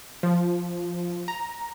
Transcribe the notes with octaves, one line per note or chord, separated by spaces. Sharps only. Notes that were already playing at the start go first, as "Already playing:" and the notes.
F3
A#5